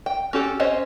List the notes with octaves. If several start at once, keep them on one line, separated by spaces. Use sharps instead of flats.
G5
C#4 F#4 G4 A4
C4 C#4 C5 C#5 D#5